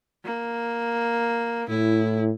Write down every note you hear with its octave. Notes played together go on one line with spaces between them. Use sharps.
A#3
A2 E4